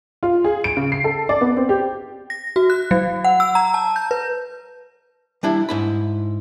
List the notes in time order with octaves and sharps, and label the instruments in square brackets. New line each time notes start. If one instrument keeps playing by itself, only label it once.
[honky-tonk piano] F4
G#4
D7
C#3
C7
A4
D5
B3
C4
G4
[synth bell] A#6
F#4
F#6
F#3
F#5
E6
A#5
A5
G6
B4
[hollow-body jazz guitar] G3 D4 E4
G#2 E4 B5